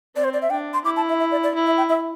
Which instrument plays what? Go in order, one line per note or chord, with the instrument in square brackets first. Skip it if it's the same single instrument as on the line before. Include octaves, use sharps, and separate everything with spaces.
[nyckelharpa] C4 [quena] D5
[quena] C5
D5
E5
[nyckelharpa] D4 [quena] G5
[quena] C6
[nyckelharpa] E4 [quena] D6
[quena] A5
E5
E5
D5
D5
[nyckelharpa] E4
[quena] E5
G5
E5